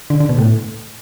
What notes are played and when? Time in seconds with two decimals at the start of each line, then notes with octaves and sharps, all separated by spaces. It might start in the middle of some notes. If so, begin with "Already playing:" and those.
0.10 D3
0.20 D3
0.29 B2
0.39 A2